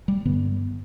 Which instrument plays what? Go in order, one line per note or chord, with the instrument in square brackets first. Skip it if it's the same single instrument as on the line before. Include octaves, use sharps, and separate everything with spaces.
[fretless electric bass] G3
G2 D3 B3